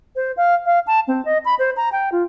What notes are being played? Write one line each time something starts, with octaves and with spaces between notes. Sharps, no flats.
C5
F5
F5
A5
C4
D#5
B5
C5
A#5
G5
F4